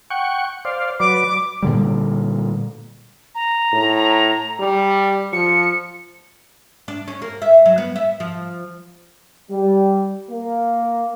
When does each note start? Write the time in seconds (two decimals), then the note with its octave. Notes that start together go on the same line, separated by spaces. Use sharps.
0.10 F#5 G5 C#6
0.65 C5 D5 F5
1.00 F#3 B4 D5 D6
1.62 A#2 D3 G3
3.35 A#5
3.73 A2
4.60 G3
5.33 F3 C#7
6.88 D4
7.08 C#4
7.22 A#3
7.42 E5
7.66 F#3
7.78 B3
7.96 E5
8.20 F3
9.51 G3
10.30 A#3